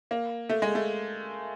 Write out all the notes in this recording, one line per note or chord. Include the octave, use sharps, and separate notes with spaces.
A#3
A3
G#3
A3